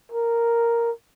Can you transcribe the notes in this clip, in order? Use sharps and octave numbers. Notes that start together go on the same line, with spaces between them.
A#4